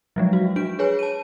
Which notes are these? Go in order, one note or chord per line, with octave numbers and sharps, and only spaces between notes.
F3 F#3 G#3
F#4
D4 F#4 D7
G#4 B4 C#5 G#5
A5 D#7